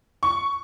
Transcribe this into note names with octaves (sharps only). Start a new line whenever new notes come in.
C#6